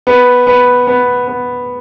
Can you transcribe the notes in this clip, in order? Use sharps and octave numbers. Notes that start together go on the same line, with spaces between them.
B3
B3
B3
B3